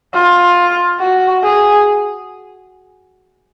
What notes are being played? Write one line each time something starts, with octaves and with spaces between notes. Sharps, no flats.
F4
F#4
G#4